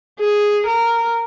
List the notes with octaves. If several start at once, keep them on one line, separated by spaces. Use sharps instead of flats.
G#4
A#4